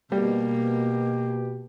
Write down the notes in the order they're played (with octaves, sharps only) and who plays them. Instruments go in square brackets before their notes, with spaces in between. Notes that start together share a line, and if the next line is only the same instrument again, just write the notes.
[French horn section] B2 [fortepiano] G3 [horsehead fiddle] A#3 [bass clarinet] G4